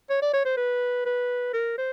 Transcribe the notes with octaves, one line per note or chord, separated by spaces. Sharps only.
C#5
D5
C#5
C5
B4
B4
A#4
C5